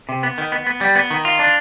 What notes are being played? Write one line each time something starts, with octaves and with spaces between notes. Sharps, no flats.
C3
B3
D#3
B3
B3
G3
B3
D#3
F4
D4